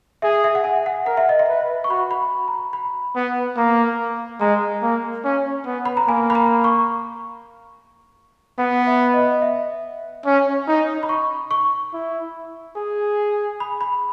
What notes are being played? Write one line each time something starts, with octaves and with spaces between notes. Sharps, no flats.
G#4 E5
E5
F#5
G#5
F#5
A#4 F#5
E5
D#5
E5
B4
C#6
F#4 B5
B5
A#5
B5
B5
B3
A#3 A#5
G#3 A#5
A#3
C#4
B3
B5
A#5
A#3 G#5
B5
A#5
C#6
B3 F#5
E5
D#5
D#5
E5
C#4
D#4
B5
C#6
C#6
E4
G#4
B5
B5